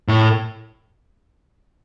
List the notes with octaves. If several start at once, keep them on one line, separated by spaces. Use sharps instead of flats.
A2